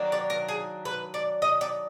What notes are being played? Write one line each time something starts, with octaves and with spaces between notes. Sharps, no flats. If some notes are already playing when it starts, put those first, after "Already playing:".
Already playing: D#3 F#3 A#3 D4
D5
A#4
G#4
B4
D5
D#5
D5